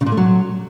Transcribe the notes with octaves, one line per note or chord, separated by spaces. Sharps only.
C#3
A#2
A3
F#3